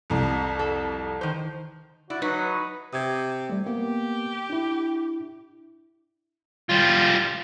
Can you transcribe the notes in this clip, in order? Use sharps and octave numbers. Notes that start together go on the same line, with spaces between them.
C2 F2
A4
D#3 C5
E4 F#4 D5
F#3 D#4 B4
C3 D#6 G#6
G3 A3
A#3 B3 G4
D4 E4
G3 F4